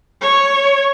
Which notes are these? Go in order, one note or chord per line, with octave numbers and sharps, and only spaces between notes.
C#5